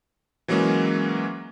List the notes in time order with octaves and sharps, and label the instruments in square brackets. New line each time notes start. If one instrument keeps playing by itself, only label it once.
[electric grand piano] E3 F#3 G#3 A#3 C#4